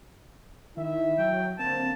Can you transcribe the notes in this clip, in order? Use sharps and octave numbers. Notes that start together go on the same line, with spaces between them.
D#3 E4 E5
F#3 G5
D3 A#3 C4 A5